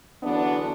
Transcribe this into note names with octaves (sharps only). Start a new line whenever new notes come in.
E2 D3 F#3 B3 D4